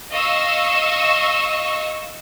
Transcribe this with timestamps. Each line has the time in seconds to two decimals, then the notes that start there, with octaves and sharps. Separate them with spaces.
0.11 D#5 F5 C#6 E6